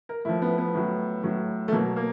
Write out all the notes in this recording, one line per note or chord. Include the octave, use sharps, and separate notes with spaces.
A#4
A2 F3 E4
B3
B3
A2 F#3
A2 F#3
A3
B2 F#3 A#3
A#3